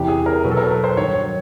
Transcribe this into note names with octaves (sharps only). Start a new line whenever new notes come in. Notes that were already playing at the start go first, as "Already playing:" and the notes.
Already playing: E2 C3 E3 G4
G#4
A#4
B2 F#3 B4
A4
A#4
B4
C5
G2 D#3 F#3 C#5
C#5